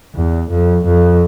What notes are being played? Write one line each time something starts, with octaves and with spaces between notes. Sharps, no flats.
E2
F2
F2